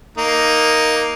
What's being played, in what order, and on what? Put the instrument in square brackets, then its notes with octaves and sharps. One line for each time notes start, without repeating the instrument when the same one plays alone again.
[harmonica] A#3 D#4